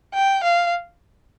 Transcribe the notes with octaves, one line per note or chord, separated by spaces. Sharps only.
G5
F5